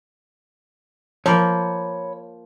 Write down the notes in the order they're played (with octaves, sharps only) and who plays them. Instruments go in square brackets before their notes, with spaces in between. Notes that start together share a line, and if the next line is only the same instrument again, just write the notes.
[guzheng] F3 A#3 [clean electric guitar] C#5 A#5 B5